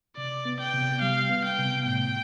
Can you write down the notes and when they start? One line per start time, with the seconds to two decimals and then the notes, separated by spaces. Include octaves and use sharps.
0.17 C3 D5
0.45 B3
0.60 G5
0.74 C3
1.01 G3 F5
1.29 B3
1.44 G5
1.58 C3
1.86 A2 G5